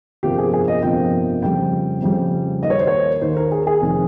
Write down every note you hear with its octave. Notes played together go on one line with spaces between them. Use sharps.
G1 F2 C3 F3 A#3 G4
G#4
G#4
D#5
G1 F2 C3 F3 A#3 G5
F2 C#3 G3 G5
F2 C#3 G3
D#2 D#3 A#3 D#5
C#5
C5
C#5
D#2 D#3 A#3 C5
A#4
G#4
G#4
F1 F2 D#3